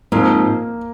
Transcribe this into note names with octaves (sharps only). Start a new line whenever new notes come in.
G#2 F3 A#3 C4